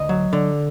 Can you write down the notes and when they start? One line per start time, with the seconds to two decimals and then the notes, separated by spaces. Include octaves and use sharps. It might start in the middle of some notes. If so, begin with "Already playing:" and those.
Already playing: D2 D#5
0.09 F#3
0.33 D3